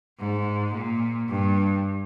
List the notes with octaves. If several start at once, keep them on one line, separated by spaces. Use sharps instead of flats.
G#2
A#2
G2